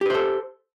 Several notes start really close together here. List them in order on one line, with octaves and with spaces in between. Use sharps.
G4 B4 C5 A4